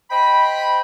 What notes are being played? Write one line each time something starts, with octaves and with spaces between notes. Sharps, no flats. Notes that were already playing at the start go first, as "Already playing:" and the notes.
C5 D#5 G5 B5